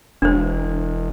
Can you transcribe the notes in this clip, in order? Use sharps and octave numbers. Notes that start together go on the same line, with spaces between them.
E1 D4 C5